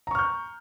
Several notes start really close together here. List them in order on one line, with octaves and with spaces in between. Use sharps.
A#5 C#6 F6 G6